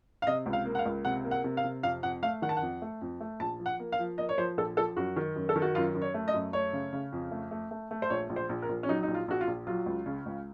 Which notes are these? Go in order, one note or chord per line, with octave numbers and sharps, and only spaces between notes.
F5
C3 D#5
C#2
F5
A#3
F#5
F5
C#2
C3 F#5
A#3
F#5
C3
F5
C3
F2 F5
F2 F#5
A3 F5
D#3 F#5
A5
F2 F#5
A3
F2
A3
A#1 A5
F3
F#5
A#3
F5
F3
A#3 D#5
C#5
F3 C5
A#1 A4
F3 A4
F#2 F#4
D#3
F#2
A4
D#3
F#4
F#2 F4
F#2
C#5
A3
D#5
F#2
A3 C#5
C#3
C#3
F2
A3
A3
A3
A3
C5
A#1 C#5
A#1
C5
A#1
A#4
A#1
C#4
F#3 D#4
D#4
A#1
F4
A#1 F#4
F4
A#1
F#3 F4
C#2
C#3
C#2